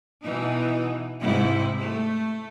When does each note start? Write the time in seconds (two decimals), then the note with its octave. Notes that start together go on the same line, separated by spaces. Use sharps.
0.23 B2 E3 D#4
1.21 G#2 C3 E4
1.80 A3